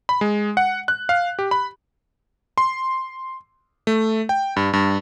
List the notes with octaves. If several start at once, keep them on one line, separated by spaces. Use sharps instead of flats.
B5
G#3
F#5
F#6
F5
G4
B5
C6
A3
G5
G2
G2